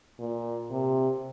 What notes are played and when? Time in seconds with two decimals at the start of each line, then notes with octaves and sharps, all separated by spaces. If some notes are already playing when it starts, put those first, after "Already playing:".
0.19 A#2
0.71 C3